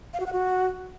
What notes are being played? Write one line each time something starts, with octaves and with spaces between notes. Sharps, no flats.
F5
F#4
F#5
F#4